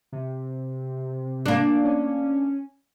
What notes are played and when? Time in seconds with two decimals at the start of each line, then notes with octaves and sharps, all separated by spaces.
0.12 C3
1.46 A#3 D4
1.84 C#4